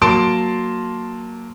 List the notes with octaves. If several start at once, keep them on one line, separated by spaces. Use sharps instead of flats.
F#3 A#3 A5 C6 D7